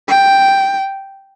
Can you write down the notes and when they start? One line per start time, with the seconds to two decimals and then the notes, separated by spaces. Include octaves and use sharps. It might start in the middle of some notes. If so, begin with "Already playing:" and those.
0.09 G5